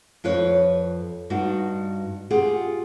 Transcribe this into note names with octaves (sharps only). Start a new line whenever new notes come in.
F2 F4 B4 C#5
G2 D#4 F#4
F4 G4 G#4 F#5